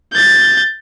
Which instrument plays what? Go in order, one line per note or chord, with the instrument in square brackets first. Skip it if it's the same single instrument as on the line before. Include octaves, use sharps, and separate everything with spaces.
[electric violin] G6 A6